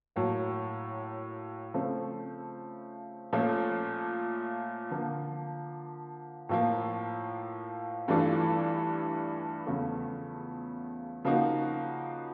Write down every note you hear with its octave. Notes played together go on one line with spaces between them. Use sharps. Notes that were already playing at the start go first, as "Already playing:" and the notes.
A2 F#3 A#3
C#3 F3 A3 C4
A#2 F3 A3 C#4
D3 F3 A#3
A2 F3 A#3
G2 E3 A3 D4 F4
E2 C#3 F3 A3
C#3 F3 A#3 D#4 F#4